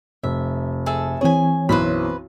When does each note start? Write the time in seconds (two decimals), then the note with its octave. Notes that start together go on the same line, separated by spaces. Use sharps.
0.23 F1 E5
0.86 G#4 A4 E5
1.21 E3 C4 G#4 C#5 G#5
1.69 B1 F#2 E4 B4 C5 B5